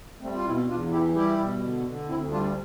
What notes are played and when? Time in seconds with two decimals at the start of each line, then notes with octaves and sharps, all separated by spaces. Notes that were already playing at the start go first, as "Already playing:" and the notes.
0.21 G3 A3 C4
0.34 F4
0.45 B2 C4 E4
0.68 E2 D4 F4
0.91 E3 E4 G4
1.14 G3 E4 G4
1.37 B2
1.61 D3
1.84 D3
2.08 D2 C4 E4
2.30 G3 D4 F4